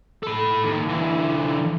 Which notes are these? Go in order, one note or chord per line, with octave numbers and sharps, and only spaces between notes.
A4 B5
D#2
D3 E3